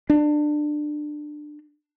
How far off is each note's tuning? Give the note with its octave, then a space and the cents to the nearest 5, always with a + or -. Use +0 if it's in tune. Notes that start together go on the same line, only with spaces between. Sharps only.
D4 +20